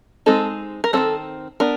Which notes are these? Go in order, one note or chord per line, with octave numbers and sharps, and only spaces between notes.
G#3 C4 D#4 A4
A#4
D#3 G3 C4 A4
B3 D4 A#4